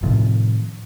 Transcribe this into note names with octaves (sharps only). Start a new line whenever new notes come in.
A2 C3 D#3 F3